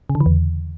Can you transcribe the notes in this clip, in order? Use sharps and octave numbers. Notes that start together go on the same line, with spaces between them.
C#3
D3
E3
E2